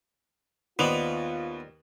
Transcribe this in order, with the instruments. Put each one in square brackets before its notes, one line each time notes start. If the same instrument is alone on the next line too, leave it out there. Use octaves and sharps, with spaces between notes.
[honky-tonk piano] D#2 F7 [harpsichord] B3 [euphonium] F4 [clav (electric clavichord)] C5 D5 D#5